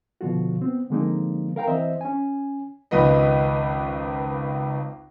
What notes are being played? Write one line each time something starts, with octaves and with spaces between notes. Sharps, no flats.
B2 D3 F3 F4 F#4
B3 C4
D3 F3 G#3 A#3 C4 D#4
A#4 F5 G5 A#5
E3 C4 C5 D#5 E5
C#4 G#5
G#1 C#2 F4 B4 D#5